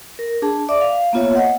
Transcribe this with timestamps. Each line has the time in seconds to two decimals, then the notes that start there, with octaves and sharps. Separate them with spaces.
0.19 A#4
0.42 D4 G#4 A5
0.69 D5 E5 D6
0.81 F5
1.13 A#3 B3 F4 C#5 E5
1.35 D#5 F#5